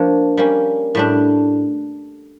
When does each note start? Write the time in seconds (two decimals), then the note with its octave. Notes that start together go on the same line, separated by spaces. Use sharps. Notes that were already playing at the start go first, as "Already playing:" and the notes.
Already playing: F3 A#3 D4 C#5
0.37 G3 A#3 C#4
0.95 A2 G3 D4